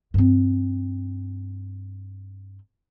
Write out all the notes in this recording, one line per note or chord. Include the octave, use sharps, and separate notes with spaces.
G2 C4